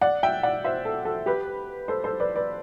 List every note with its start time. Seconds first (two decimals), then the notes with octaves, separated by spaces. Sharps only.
0.01 D5 F#5
0.23 E5 G5
0.43 D5 F#5
0.64 C5 E5
0.85 A4
1.05 A4
1.26 G4 B4
1.88 A4 C5
2.04 A4 C5
2.20 B4 D5
2.36 B4 D5